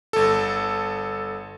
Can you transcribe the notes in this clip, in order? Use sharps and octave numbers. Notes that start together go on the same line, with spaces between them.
G1 A4